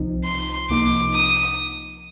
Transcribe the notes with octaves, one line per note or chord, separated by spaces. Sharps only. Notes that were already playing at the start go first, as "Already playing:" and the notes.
Already playing: C2 C3 F3 C4 D#4
C6
C2 C3 F3 A#3 D#4 D6
D#6